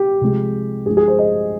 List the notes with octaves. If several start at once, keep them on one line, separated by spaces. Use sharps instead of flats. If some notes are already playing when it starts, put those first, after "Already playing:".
Already playing: G4
C3 F3 G#3
G2 F3 G#3 G#4
G#4
C5
D#5